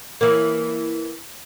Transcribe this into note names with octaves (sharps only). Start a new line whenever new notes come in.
E3 A#3